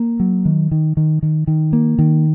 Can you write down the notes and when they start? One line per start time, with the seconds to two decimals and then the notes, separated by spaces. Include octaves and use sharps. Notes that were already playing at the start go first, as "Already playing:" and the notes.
Already playing: A#3
0.20 F#3
0.45 D#3
0.71 D#3
0.97 D#3
1.22 D#3
1.47 D#3
1.73 A#3
1.99 D#3